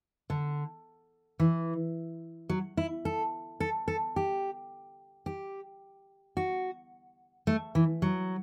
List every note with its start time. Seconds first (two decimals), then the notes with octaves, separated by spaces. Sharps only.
0.30 D3
1.39 E3
2.49 F#3
2.77 E4
3.05 A4
3.60 A4
3.88 A4
4.16 G4
5.26 G4
6.37 F#4
7.47 A3
7.75 E3
8.02 F#3